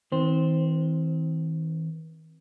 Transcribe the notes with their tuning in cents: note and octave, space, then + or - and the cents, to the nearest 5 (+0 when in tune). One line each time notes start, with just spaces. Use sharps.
E3 -45 C4 +0 C5 +0